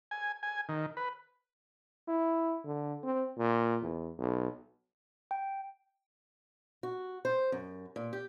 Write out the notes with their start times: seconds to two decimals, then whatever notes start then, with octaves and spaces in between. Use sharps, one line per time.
0.11 G#5
0.43 G#5
0.69 D#3
0.97 B4
2.08 E4
2.65 D3
3.03 C4
3.38 A#2
3.82 E2
4.19 B1
5.31 G5
6.83 F#4
7.25 C5
7.52 F#2
7.96 A#2
8.13 G4